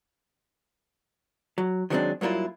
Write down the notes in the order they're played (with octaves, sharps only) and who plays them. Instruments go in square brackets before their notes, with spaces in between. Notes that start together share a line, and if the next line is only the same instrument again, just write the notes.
[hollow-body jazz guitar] F#3
D#3 F#3 G#3 A#3 C4 D4
G2 F#3 A#3 E4 F4